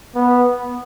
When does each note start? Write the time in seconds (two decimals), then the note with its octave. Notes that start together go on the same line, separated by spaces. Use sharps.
0.15 B3